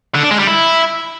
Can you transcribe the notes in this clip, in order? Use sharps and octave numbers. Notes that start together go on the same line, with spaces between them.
D3
D4
G#3
G3
E4